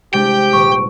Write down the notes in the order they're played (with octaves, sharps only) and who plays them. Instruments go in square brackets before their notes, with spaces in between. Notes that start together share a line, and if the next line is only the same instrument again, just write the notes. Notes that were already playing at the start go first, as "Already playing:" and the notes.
[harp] C3 G#3 D4 [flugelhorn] G4 [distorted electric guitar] G5
[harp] D#1 [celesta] C#6